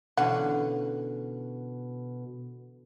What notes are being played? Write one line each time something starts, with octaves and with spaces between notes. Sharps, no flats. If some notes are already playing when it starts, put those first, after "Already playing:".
B2 D3 E3 C#4 F#5